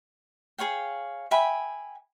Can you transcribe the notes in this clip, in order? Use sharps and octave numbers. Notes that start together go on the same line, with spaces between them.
G#4 C#5 F5 G5
E5 G5 G#5 B5